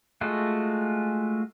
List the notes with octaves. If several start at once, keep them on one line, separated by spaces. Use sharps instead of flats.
G#3 A3 F4 F#4